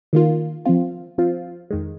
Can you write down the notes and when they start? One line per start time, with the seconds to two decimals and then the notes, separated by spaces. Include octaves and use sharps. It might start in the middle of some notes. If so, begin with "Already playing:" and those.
0.13 D#3 A#3 F4
0.66 F3 C4 F4
1.18 F3 C4 F4
1.71 F2 D#3 G#3